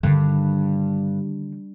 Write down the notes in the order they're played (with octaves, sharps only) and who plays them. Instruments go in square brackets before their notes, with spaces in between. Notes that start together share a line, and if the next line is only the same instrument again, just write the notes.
[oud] G2 [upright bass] D3 D#3